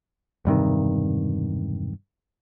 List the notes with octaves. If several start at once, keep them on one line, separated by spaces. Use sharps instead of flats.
E1 G2 C3 D#3